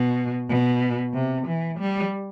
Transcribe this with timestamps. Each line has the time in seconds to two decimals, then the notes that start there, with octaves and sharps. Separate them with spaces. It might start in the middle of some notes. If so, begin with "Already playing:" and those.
Already playing: B2
0.49 B2
1.14 C3
1.47 E3
1.79 G3